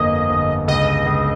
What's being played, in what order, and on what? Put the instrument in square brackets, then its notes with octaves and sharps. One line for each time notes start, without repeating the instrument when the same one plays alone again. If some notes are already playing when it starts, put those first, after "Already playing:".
Already playing: [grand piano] G1 F2 A#3 [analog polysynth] D#5
[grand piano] G1
[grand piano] C#2 [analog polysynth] D#5
[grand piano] C#2